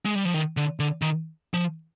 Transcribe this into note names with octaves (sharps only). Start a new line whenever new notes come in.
G#3
G3
F3
D#3
D3
D3
D#3
F3